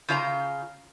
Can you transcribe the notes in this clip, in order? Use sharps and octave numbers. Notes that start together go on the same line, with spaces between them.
C#3 F4 D#5 A#5